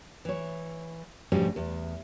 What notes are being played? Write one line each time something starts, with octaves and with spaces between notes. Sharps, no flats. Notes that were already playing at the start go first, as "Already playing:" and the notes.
E3 C#5
D2 G#2 B2 F3 G3 C#4
E2